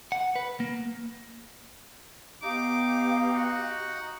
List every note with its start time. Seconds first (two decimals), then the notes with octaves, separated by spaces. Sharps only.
0.12 F#5
0.36 B4
0.60 A#3
2.42 B3 D#4 G4 F5 D6
3.34 F#4